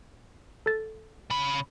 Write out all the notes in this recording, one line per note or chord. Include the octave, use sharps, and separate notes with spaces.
A4 A6
C#3 B5